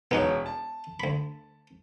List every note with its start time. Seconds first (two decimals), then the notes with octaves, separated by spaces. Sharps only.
0.11 E1 B3 D#4 C#5 F#5
0.46 A5
1.00 D2 B5